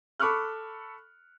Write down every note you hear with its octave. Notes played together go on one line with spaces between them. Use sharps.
A4 B5 C#6 D6 F6 F#6